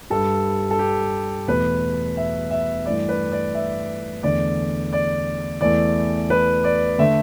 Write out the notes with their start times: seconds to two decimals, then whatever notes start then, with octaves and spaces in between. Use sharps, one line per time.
0.10 G2 G3 A4
0.71 A4
0.79 G4
1.48 E2 B2 A3 B4
2.17 E5
2.51 E5
2.86 G2 E3 A3 D5
3.09 B4
3.32 D5
3.55 E5
4.23 E2 D3 A3 D5
4.93 D5
5.61 E2 E3 A3 D5
6.30 B4
6.64 D5
6.98 D3 A3 E5